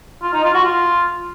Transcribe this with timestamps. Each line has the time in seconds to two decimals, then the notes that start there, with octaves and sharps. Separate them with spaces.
0.23 F4
0.33 D#4
0.44 F4
0.54 F#4
0.64 F4